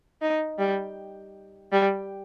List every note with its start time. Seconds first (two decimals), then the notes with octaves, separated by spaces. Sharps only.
0.22 D#4
0.59 G3
1.72 G3